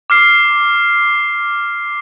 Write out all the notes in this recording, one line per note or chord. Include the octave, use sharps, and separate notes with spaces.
D6 F6 C7